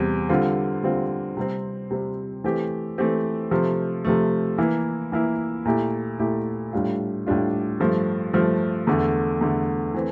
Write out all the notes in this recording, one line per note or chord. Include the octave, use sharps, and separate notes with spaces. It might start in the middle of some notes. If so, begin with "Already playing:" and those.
Already playing: E2 C3 G3 C4
D3 G3 C4 F4
D3 G3 C4 F4
C3 G3 C4
C3 G3 C4
E3 A3 C4 G4
E3 A3 C4 G4
C3 F3 A3
C3 F3 A3
E3 A#3 E4
E3 A#3 E4
A#2 A3 E4 G4
A#2 A3 E4 G4
A2 G3 D4 F4
A2 G3 D4 F4
G2 F3 A3
G2 F3 A3
E2 D3 A3
E2 D3 A3
E3 A3 C4